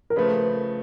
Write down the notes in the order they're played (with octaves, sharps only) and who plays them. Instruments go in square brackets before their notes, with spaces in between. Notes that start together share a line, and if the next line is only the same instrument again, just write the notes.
[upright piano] A#4
[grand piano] C#3 F3 A3 [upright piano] B4